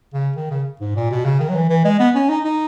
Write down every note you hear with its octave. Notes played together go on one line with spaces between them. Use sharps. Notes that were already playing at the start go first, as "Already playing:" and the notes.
C#3
D#3
C#3
G#2
A#2
B2
C#3
D#3
F#3
E3
E3
G#3
B3
C#4
D#4
D#4